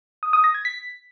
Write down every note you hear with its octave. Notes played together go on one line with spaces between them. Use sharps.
D#6
D#6
A#6
G#6
B6